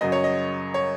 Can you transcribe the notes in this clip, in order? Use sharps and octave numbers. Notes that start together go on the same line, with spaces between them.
F#2 C#3 F#3 D#5
C#5
D#5
C#5